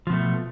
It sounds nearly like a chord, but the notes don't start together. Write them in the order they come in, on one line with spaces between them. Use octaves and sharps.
F3 B2 A3